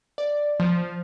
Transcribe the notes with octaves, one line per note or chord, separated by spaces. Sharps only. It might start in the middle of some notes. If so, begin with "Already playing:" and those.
D5
F3